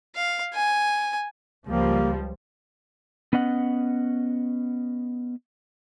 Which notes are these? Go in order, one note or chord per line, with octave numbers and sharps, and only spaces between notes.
F5
G#5
C#2 F3 G3 A#3
B3 C#4 D#5 F#5